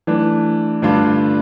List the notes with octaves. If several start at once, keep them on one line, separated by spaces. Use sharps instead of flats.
E3 A3 D4
G2 D3 A3 D4 F4